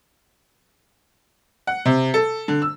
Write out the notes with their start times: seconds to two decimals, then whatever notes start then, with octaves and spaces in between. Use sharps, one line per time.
1.67 F#5
1.86 C3
2.14 A4
2.48 D3
2.62 E6